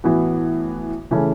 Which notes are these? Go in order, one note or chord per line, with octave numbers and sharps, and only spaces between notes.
A2 E3 B3 F#4
C#3 E3 A3 C#4